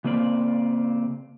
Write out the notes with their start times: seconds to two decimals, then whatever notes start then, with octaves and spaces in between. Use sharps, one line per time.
0.04 C#3 A#3 C4 D5